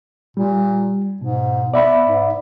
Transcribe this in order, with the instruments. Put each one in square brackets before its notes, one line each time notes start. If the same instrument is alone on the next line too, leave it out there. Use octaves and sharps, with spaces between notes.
[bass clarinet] A#2 [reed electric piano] G3
[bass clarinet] G#2 [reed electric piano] B2
[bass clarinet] B3 [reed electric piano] D5 E5 B5
[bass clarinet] G#2